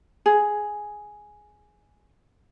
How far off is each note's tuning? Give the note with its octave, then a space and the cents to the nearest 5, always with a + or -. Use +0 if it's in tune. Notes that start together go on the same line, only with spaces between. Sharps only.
G#4 +5